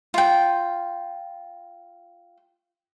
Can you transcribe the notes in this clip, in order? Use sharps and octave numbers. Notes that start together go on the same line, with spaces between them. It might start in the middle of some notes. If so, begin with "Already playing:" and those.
F4 G5